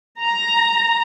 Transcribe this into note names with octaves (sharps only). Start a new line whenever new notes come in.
A#5